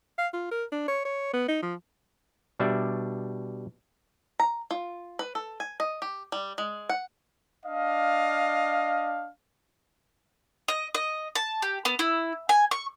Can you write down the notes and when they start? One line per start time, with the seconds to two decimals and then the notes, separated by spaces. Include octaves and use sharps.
0.18 F5
0.33 F4
0.51 A#4
0.72 D4
0.88 C#5
1.05 C#5
1.34 B3
1.48 D#4
1.62 F3
2.59 B2 G3 D4 D5 E5
4.40 A#5
4.71 F4
5.19 B4
5.35 A4
5.60 G#5
5.80 D#5
6.02 G4
6.32 G3
6.58 G#3
6.89 F#5
7.66 D4 D#5 F5
10.68 D#5
10.95 D#5
11.35 A5
11.62 G4
11.85 B3
11.99 E4
12.49 G#5
12.71 C#6